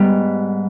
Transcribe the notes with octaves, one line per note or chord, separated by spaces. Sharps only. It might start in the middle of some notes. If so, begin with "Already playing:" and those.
Already playing: G#2 G3 B3